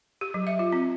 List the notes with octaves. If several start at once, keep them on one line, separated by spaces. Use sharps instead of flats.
G4
F#3
E5
F4
C4